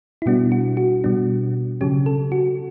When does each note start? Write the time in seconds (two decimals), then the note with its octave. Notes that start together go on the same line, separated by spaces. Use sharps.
0.22 E4
0.26 B2 G3 B3 D4 F#4
0.52 F#4
0.77 F#4
1.04 B2 G3 B3 D4
1.81 C#3 F#3 C#4 G4
2.06 A4
2.32 F#4